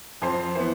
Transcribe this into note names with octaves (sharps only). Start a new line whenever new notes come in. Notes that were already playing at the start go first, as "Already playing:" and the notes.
F2 C5
E3 B3 C5